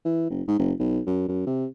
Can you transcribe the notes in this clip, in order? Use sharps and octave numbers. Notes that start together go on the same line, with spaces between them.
E3
F#1
G#2
F#1
B1
F#2
F#2
C3